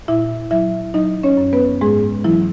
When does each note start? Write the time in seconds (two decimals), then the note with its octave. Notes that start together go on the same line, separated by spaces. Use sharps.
0.08 A#2 E4 E5
0.51 F#3 E4 E5
0.94 F#3 D#4 D#5
1.23 C#4 C#5
1.37 F#2
1.53 B3 B4
1.81 G#2 G#3 G#4
2.24 E3 F#3 E4